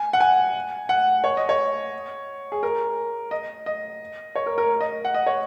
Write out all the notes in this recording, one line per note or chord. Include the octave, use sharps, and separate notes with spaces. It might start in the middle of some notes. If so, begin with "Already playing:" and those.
Already playing: G#5
F#5
G#5
F#5
C#5
D#5
C#5
G#4
A#4
D#5
D#5
C#5
A#4
A#4
D#5
F#5
D#5
C#5